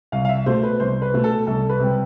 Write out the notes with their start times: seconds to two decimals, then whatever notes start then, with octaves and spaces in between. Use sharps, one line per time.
0.12 C2 F5
0.25 F5
0.29 E5
0.46 B2 A3 C5
0.63 B4
0.80 C2 C5
1.02 B4
1.14 B2 A3
1.24 A4
1.47 C2 A4
1.70 B4
1.80 C3 G3